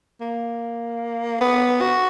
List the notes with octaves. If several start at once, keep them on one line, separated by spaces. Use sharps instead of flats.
A#3
B3
F#4